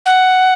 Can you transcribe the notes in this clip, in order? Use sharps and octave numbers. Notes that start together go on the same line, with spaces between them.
F#5